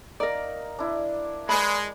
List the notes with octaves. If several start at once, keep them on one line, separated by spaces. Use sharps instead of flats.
A#3 D#4 A#4 D5
D4 E4
G#3 B4 D5 B5